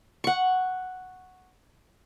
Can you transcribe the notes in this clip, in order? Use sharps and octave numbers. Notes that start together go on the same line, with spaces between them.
F#5 C#6